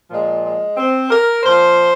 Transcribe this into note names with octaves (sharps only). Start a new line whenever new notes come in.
A#2 F3 G#3
G#3
C4
A#4
A#2 F3 C5